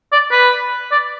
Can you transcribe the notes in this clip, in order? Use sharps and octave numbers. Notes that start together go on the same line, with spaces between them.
D5
B4
D5